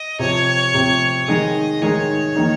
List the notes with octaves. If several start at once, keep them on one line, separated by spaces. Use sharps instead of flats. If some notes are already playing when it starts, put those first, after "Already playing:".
Already playing: D#5
C3 F3 C4 C#5
C3 F3 C4
D#3 G#3 D#4 G#4 D#5
D#3 G#3 D#4 G#4 C#5
D#3 A#3 D#4